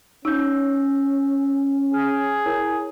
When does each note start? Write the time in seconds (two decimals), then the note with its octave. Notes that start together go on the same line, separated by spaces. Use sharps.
0.25 C#4 D#4 E6 G6
1.94 G#4 F6
2.46 E4 A#4 C#5